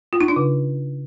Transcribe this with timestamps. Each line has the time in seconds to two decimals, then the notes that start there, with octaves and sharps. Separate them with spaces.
0.13 F4
0.21 D#4
0.28 D4
0.36 C#3